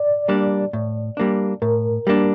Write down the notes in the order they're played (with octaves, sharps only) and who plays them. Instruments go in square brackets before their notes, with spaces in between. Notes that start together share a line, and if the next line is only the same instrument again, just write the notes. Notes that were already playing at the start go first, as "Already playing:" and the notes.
Already playing: [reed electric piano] D5
[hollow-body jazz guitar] G3 A#3 D4
A2
G3 A#3 D4
[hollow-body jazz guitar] A2 [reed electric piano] A#4
[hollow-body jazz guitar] G3 A#3 D4